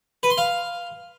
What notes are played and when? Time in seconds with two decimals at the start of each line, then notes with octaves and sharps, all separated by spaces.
0.23 B4
0.30 C6
0.38 F5